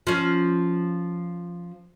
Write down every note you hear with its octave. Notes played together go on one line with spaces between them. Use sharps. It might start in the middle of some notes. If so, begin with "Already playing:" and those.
F3 C#4